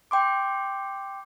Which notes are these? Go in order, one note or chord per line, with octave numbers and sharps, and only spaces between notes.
G5 C6 D6